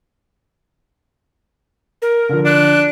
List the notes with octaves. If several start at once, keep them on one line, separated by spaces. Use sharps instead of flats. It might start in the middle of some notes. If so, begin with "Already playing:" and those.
A#4
D3 F3
D4 F#6